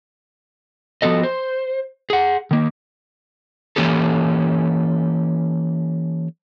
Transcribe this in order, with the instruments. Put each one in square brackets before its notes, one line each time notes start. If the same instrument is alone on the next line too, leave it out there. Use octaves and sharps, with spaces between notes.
[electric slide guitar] F3 B3 F#4 A4 D#5
C5
G#4 F#5
D#3 A#3
E3 A#3 C#4 G4 A4